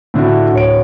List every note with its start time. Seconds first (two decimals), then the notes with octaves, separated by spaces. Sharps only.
0.14 A2 D3 E4 F#4
0.53 D1 C#5 D7